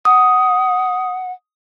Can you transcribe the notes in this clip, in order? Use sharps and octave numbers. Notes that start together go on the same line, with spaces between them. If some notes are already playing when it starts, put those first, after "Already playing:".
F#5 D#6